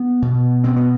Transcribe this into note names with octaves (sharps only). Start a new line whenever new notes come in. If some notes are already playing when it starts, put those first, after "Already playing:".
Already playing: B3
B2
B2 C4
B3